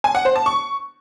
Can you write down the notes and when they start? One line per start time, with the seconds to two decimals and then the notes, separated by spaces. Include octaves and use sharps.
0.04 G#5
0.15 F#5
0.25 C5
0.36 A5
0.46 C#6